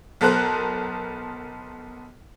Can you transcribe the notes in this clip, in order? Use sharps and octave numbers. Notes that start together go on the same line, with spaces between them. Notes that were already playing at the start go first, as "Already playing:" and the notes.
B1 B3 A4 A#4 C5 F#6